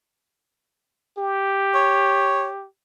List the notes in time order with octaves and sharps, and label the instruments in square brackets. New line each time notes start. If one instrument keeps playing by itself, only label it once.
[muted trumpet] G4
[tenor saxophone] C#5